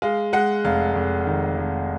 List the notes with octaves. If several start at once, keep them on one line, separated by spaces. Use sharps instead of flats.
G#3 F5
G#3 F#5
F1 F5
F1
D#3
F1